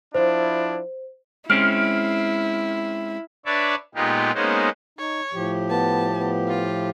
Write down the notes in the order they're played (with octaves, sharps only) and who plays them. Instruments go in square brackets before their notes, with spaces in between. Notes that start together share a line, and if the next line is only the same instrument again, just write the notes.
[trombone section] F3 D4 E4 [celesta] C5
[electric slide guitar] G#3 C4 C#4 [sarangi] E4 [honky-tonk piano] F6
[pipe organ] D4 B4 C#5 D5 E5
A#2 G#3 B3 D#4 F4 G4
G#3 A#3 B3 C#4 D#4 C5
[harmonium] D#4 [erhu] C#5
[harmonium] A2 F3 G4
[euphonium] B3 [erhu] A5
[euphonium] B3
[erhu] F4